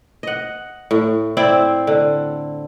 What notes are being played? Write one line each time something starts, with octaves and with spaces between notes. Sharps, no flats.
D#5 F#5
A2
C4 E4 C5 D5
D3